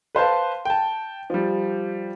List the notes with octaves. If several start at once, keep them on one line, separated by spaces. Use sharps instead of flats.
B4 C5 F5 A5
G5 A5
F3 G3